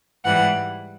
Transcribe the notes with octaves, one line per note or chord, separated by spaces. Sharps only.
G#2 E3 G3 F#5